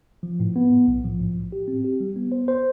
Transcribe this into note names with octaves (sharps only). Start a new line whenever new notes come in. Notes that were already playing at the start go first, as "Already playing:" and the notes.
F3
A2
B3
A2
B1
F3
A2
A2
G4
C4
G4
G3
B3
C5
C5